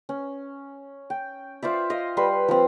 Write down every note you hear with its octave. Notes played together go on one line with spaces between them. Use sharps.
C#4
G5
F4 C5 D5 E5
D#5 F5
G3 B4 C6 E6
F3 C4